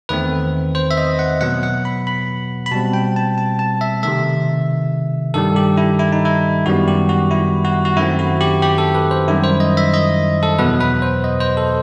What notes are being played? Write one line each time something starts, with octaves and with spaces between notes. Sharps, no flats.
E2 D#3 A3 C4 B4
C5
E5
D#5
F#5
B2 F#3 B3 F#5
F#5
B5
B5
B5
B2 G3 C4 A5
G5
A5
A5
A5
E5
C3 D#3 A3 E5
G2 D#3 G3 A4
G4
E4
E4
D#4
E4
F#2 D#3 G3 B3 F#4
G4
F#4
E4
F#4
F#4
F#2 D#3 A3 C4 E4
F#4
G4
G4
A4
B4
C5
F#2 D#3 G3 E4
C5
D#5
E5
D#5
A4
E2 B2 F#3 B3 B4
B4
C5
D#5
C5
A4